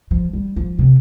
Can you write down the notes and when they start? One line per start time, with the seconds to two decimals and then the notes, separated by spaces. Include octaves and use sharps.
0.11 F3
0.33 G3
0.56 F3
0.79 C3